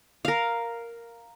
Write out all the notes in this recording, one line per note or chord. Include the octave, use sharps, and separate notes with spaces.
A#4 F5